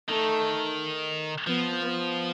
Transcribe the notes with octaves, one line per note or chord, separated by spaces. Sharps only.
D#3 A3
F3 B3
B3